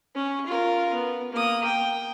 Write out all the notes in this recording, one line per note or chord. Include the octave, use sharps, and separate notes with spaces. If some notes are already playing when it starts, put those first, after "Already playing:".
C#4
F4 A#4
B3
A#3 D#6
G5